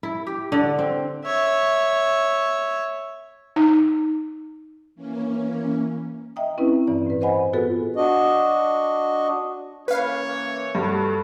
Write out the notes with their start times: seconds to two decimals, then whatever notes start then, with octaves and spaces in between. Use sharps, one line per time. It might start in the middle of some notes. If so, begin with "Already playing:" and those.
0.03 E4
0.27 G4
0.52 D3
0.79 C4
1.25 C#5 E5
3.56 D#4
4.95 E3 A#3 C#4
6.36 D#5 E5 G5 A#5 D#6
6.58 C4 C#4 E4 B4
6.87 G2 E3 D5
7.06 A2 B4
7.21 B4 C5 D#5 F#5 G#5 B5
7.53 B3 F4 F#4 G#4 A4 B4
7.96 D4 F#4 D#5
9.88 E3 A#3 C#4 B4 C#5 F5
10.75 G2 F#4 A4